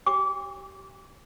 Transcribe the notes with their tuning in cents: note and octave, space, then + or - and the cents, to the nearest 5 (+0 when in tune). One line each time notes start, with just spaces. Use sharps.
G4 -30 G5 +40 D6 -25